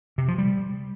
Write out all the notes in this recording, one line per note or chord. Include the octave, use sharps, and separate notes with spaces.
C3
F3
G3